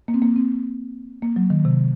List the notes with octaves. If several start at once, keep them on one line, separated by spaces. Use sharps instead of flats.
A#3
C4
A#3
C4
A#3
F#3
D#3
C3